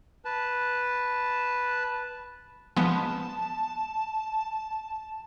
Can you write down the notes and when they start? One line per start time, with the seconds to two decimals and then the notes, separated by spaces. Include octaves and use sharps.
0.25 B4 A5
2.77 F3 G#3 B3 A5